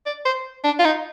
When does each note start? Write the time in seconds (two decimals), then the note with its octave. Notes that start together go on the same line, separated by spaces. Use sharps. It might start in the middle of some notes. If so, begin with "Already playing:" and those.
0.06 D5
0.25 C5
0.64 D4
0.79 F4
0.85 D#4